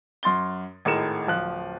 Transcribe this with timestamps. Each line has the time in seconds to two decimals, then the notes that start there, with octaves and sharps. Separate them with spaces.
0.23 F#2 C6 A6 G7
0.85 G#1 A2 G#3 A#4 C#7 E7
1.27 D1 F3 F#6